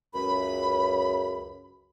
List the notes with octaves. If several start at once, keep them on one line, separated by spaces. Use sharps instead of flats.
C#2 F#2 B5